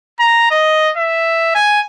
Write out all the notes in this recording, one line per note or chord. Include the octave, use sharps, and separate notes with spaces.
A#5
D#5
E5
G#5